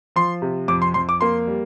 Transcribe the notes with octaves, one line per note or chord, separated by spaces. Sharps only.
F3 C6
C3
F2 D6
C6
F2 C6
D6
A#3 C6
G3